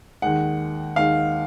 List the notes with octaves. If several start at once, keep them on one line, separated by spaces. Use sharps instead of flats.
D#2 D#3 G#3 F#5
D#2 D#3 G#3 F5